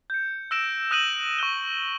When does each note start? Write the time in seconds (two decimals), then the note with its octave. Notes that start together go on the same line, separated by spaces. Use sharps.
0.10 G6 C#7
0.51 E6 F#6 A#6 D7 E7
0.91 D#6 F#6 A#6 D#7 E7 F#7
1.39 C#6 D#6 F#6 G7